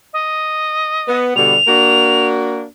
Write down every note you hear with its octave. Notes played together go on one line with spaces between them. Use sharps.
D#5
B3
B2 D3 G3 F7
A#3 D4 F#4